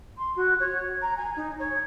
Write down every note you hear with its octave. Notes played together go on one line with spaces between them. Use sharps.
C6
F#4
C#5
A#5
G#5
D#4
C#5